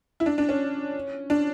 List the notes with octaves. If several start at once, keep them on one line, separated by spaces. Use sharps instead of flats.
E4
D4
D4
C#4
D4